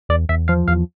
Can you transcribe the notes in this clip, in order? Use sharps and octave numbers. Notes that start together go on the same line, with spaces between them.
E2 D5
E2 E5
F3 F5
E2 F5